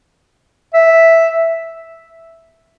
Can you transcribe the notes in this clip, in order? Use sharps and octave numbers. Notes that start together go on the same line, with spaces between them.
E5